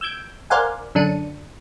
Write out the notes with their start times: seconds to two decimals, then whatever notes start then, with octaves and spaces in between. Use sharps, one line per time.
0.01 E6 G6 G#6 D7
0.50 A#4 C5 D5 F5 F#5 G#5
0.95 F#2 D3 D4 C#7 D#7